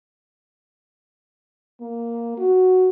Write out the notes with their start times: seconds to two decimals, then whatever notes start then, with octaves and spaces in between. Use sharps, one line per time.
1.81 A#3
2.38 F#4